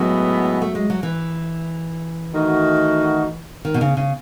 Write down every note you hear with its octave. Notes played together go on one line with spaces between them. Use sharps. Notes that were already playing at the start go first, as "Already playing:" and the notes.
Already playing: A2 F#3 G#3 B3
A3
G#3
F#3
E3
D#3 A3 D#4 F#4
D#3
B2
C#3
C#3